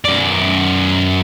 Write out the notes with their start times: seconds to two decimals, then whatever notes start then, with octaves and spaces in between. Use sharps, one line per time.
0.05 F#2 D5